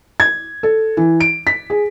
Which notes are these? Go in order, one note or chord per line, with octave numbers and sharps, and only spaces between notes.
G#6
A4
E3
D7
B6
G#4